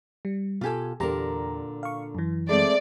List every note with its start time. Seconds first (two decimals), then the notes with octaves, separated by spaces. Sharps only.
0.25 G3
0.61 B2 F4 G4 A4 G#5
1.00 E2 A#2 D3 G4 A#4 A#5
1.83 F5 C#6
2.15 F#2 E3
2.49 G#3 A3 C4 D5